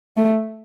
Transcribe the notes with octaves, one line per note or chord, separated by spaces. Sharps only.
A3